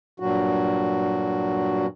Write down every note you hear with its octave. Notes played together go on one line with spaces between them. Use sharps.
G2 A#2 F#3 F#4